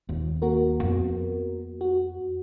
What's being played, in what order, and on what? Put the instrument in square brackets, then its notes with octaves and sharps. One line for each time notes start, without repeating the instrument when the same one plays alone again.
[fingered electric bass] D#1
[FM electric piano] A#3 F#4 A#4
[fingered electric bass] F2 B3
[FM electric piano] F#4